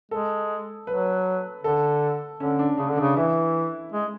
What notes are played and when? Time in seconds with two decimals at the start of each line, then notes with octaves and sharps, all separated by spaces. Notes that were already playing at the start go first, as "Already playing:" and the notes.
0.11 G#3 A4
0.87 F#3 B4
1.64 D3 A4
2.40 D3 C#4
2.59 D4
2.78 C#3 D4
2.90 D3
2.97 C#3 D4
3.16 E3 E4
3.92 G#3